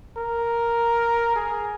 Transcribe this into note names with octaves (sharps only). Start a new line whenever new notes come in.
A#4
G#4